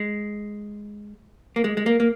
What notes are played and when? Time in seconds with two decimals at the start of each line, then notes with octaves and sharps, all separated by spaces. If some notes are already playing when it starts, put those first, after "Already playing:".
Already playing: G#3
1.56 A#3
1.64 G#3
1.77 G#3
1.86 A#3
2.00 A#3